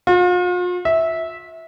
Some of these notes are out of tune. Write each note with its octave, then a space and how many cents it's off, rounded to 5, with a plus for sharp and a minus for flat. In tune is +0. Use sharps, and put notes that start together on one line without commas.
F4 +40
E5 -15